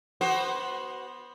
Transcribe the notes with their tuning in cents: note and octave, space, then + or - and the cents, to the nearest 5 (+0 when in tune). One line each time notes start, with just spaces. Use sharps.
B3 -10 F#4 +20 C5 +10